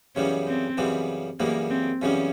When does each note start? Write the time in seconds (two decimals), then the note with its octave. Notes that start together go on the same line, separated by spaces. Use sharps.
0.15 F#2 C#3 E3 G3 B3 C#4
0.47 C4
0.77 F#2 C#3 E3 G3 B3
1.39 F#2 C#3 E3 G3 A#3 B3
1.70 C4
2.02 F#2 C#3 E3 G3 B3 C#4